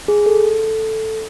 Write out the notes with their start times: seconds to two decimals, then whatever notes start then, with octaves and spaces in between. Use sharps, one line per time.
0.08 G#4
0.26 A4